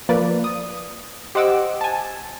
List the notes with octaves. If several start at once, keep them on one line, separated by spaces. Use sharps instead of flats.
F3 A#3 B4 D5
D#6
G4 C5 D#5 F#5 D6 E6
G#5 A5